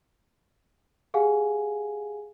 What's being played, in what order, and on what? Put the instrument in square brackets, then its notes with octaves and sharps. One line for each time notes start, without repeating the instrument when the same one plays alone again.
[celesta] G4 G#4 F5 F#5 G#5